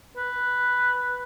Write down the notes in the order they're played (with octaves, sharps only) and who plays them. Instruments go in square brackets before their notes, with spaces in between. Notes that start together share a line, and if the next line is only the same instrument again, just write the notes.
[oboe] B4